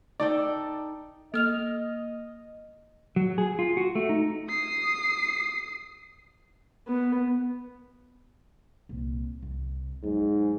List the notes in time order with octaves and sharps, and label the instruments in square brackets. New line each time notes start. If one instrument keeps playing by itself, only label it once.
[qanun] D#4 A4 G5 [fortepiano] D5
[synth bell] A#3 [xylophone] A4 F6 F7 [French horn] D#5
[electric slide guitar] F#3
G#4
F4
F#4
A3
D#4
[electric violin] D#6 C7
[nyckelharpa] B3
[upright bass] C2 A#2
C2
[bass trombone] G#2 [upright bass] F#3